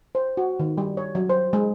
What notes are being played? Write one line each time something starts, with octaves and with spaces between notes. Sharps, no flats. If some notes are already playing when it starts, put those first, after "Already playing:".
C5
F#4
D#3
G3
C#5
F#3
C5
G#3